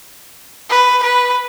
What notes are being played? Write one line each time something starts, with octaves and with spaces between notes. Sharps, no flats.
B4
B4